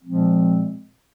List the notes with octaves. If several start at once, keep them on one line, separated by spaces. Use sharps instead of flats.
A#2 F3 G#3 C4